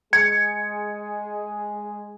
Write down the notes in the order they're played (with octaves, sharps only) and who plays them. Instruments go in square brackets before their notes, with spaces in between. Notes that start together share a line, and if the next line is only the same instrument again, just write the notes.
[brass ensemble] G#3 G#4 [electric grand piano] G#6 C#7